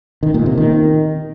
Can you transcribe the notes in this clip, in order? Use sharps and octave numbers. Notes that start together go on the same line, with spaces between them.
D#3
A#2
C3
D#3